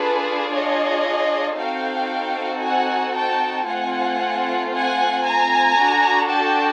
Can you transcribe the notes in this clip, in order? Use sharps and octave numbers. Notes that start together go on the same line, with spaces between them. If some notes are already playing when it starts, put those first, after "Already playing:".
Already playing: D4 F4 G#4 A4 B4
C#5 D#5
C4 D#4 F#4 A4 F5 G5
F#5 G#5
G5 A5
A3 C4 F4 F#5 G#5
F#5 G#5
G#5 A#5
D4 F#4 A4
G5 A5